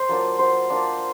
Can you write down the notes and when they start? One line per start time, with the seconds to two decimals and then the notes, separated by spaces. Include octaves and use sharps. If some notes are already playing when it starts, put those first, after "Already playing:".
Already playing: C5
0.09 F#3 A#3 D4 F4
0.39 C5
0.69 A#3 D4 F4